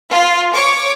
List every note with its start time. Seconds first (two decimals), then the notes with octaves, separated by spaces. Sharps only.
0.11 F4
0.53 C#5 C#6 D6